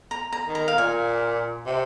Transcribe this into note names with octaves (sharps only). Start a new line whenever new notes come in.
A#5
A#5
D#3
A#5
F5
A#2 G#5
C3